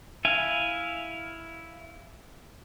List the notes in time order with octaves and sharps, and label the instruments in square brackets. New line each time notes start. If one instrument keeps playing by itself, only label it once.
[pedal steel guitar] E4 E5 F5 G#5